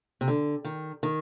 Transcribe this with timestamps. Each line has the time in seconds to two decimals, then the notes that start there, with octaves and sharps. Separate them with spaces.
0.21 C3
0.28 D3
0.65 D#3
1.03 D#3